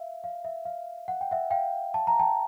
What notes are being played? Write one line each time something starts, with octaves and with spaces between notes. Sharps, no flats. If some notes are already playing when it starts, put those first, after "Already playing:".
Already playing: E5 F5
F5
E5
F5
F#5
G5
E5 F#5
F5 G5
A5
A#5
G5 A5